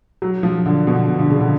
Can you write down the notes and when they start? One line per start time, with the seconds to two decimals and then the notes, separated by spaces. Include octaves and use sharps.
0.22 F#3
0.43 F3
0.66 D3
0.87 B2
1.19 D3
1.30 C#3
1.41 D3